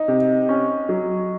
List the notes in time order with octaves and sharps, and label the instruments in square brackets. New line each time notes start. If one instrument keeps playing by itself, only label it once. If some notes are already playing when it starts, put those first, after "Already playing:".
Already playing: [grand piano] D#4
[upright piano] C3
C#4
F#3